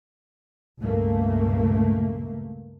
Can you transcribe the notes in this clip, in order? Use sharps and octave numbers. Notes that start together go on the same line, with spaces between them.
C#2 G2 A#2 A3 A#3